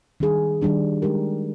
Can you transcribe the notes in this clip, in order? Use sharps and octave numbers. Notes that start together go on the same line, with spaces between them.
D#3 G3 D4 G#4
D#3 G3 D4 G#4
G#3 D#4 G4 A#4